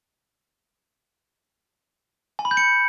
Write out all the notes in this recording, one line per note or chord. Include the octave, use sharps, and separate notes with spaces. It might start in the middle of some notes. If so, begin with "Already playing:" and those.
G#5
B5
G6
C#7